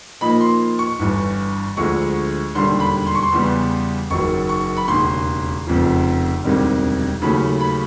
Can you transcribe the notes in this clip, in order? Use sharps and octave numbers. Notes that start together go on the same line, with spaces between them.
A#2 F3 A#3 D#4 B5
C6
C#6
G1 G2 E3
D2 D3 F3 G#3 C#6
E1 D#2 D3 G3 C6
B5
C6
C#6
C6
E2 C#3 E3 G3 B3
F#1 F#2 D#3 F#3 C#6
C#6
B5
E1 D#2 C#3 C6
F1 F2 C#3 F3
E1 D2 C3 D#3 G3
D#2 C#3 F#3 A3 C#4 B5
B5